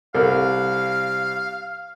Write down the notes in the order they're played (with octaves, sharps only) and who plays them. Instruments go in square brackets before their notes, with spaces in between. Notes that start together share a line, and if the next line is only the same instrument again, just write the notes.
[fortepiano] C2 [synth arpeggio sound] A4 A#4 [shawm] F5